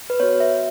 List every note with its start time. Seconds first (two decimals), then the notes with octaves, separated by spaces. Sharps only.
0.10 B4
0.20 B3 F#4 C#5
0.40 E5